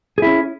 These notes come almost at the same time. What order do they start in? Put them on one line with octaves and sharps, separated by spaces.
G#4 E4 C#4